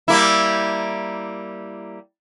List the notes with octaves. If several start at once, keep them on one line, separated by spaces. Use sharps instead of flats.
G3 A#3 E4